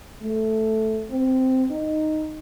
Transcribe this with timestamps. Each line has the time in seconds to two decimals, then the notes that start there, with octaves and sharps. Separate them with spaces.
0.22 A3
1.11 C4
1.71 D#4